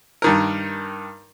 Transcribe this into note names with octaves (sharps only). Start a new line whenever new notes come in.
G2 D#3 A#4